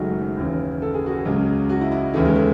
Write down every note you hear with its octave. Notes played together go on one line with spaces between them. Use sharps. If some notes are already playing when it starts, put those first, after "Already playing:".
Already playing: F#1 F#2 D#3 F#3 G#3 A3 D#4 F#4
D#2 C#3 E3
A4
G#4
F#4
G#4
C#2 C#3 F#3
F#4
E4
E4
D#2 C#3 E3 A3
G#3
A3